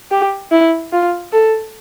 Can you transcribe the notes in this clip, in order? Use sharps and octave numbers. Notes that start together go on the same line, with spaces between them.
G4
E4
F4
A4